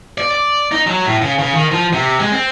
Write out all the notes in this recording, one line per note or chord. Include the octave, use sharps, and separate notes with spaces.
D5
D5
D#4
F#3
A2
C#3
C#3
D#3
F3
C3
G#3
C4